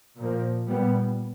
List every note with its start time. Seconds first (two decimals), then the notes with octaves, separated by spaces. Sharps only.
0.16 A#2 F3 A#3
0.66 A#2 G3 B3